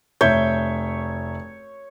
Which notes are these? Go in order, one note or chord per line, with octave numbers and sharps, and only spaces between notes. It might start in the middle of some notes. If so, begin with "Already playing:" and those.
F1 C#5 E5 G6